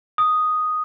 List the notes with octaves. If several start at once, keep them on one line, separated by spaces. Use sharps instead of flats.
D#6